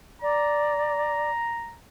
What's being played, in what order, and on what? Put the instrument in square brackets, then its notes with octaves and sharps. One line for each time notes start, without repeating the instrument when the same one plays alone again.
[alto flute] D5 [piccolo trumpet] A#5